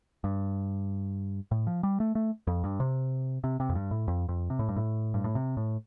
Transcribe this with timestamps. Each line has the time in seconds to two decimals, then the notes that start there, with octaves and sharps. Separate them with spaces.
0.24 G2
1.51 A2
1.67 F3
1.83 G3
2.00 A3
2.15 A3
2.47 F2
2.64 G2
2.80 C3
3.44 C3
3.60 C3
3.69 F2
3.75 G2
3.91 A2
4.08 F2
4.29 F2
4.50 C3
4.59 A2
4.69 G2
4.76 A2
5.14 G2
5.24 A2
5.35 C3
5.57 A2